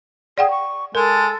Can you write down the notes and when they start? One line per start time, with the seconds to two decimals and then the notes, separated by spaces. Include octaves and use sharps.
0.38 G#4 D5 F#5 G5
0.50 C#6
0.95 G#3 A4 A#4